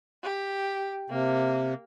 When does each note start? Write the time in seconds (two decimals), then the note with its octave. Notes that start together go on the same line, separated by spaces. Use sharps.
0.23 G4
1.10 C3 A#3